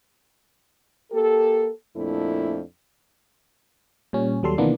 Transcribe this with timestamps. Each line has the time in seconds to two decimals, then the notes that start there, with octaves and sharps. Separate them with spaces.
1.12 A#3 G4 A4
1.96 F2 A#2 A3 D4 E4
4.13 A#2 G3 C#4
4.43 D#2 F#3 G3 A4 C6
4.58 C3 D#3 E3 A#3 B3 D4